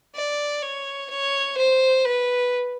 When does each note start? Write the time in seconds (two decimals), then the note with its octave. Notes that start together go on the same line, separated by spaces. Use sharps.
0.15 D5
0.63 C#5
1.10 C#5
1.57 C5
2.05 B4